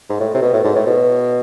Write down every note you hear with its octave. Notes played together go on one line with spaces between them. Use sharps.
G#2
A2
C3
B2
A2
G#2
A2
B2